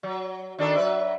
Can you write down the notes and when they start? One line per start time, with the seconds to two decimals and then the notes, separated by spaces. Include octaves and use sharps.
0.03 F#3
0.58 D#3 D4 A4
0.75 F#3 B4 E5